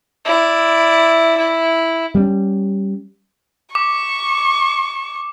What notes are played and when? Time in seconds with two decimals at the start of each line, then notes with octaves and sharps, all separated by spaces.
0.25 E4 D5
1.37 E4
2.15 G3 A#3 C#4
3.75 C#6 D6